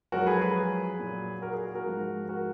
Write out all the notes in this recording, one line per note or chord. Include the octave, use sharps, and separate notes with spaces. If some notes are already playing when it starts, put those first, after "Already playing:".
F#2 F3 G#3 F#4 A#4
G#4 B4
G#4 B4
A#2 F#3
F#4 A#4
G#4
F#4
F#4 A#4
G#2 F3 G#3
F#4 A#4